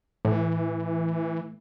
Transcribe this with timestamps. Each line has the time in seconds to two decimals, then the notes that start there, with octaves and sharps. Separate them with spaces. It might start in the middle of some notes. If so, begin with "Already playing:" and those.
0.25 A2 E3